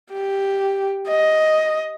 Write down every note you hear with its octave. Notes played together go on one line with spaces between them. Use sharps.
G4
D#5